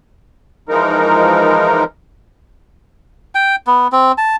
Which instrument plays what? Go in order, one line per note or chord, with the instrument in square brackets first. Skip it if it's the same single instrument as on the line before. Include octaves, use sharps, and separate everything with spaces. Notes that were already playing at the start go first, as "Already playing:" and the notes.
[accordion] E3 F3 G#3 D#4 A#4
[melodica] G5
B3
C4
A5